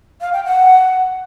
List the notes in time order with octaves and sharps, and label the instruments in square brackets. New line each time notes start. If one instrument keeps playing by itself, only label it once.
[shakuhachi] F5
G5
F#5